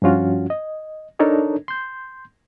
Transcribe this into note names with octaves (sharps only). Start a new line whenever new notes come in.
G2 F3 C#4 F4 F#4
D#5
D4 D#4 A4 A#4 C#5 D#5
C6 G6